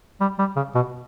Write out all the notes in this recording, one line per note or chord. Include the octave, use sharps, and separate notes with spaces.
G3
G3
C#3
B2